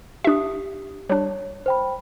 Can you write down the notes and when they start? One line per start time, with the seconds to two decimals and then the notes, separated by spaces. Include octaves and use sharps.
0.24 D4 G4 E5 D#6
1.10 G3 D4 C#5
1.66 C5 G5 B5